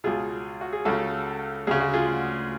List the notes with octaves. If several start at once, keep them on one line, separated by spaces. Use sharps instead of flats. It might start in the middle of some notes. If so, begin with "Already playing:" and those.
C#2 B2 F4 G#4
F#4
G#4
C#2 C#3 F#4 A4
D2 C#3 G#4
F#4
F4 G#4